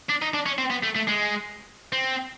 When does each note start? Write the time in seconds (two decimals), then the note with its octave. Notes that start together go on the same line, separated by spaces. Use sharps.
0.09 D4
0.22 D#4
0.34 D4
0.46 C#4
0.58 C4
0.70 B3
0.83 A3
0.95 A3
1.07 G#3
1.92 C4